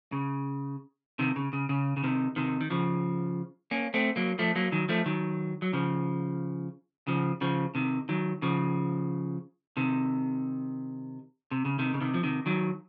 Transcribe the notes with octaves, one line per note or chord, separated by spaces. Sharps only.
C#3
C3 D#3
C#3
C#3
C#3
C#3
C3 D#3
C3 D#3
D#3
C#3 F3
A#3 C#4
A3 C4
F#3 A#3
F3 A3
F#3 A#3
D#3 F#3
F3 A3
D#3 F#3
F#3
C#3 F3
C#3 F3
C#3 F3
C3 D#3
D#3 F#3
C#3 F3
C3 D#3
C3
C#3
C3 D#3
C#3
C3 D#3
F3
C3 D#3
D#3 F#3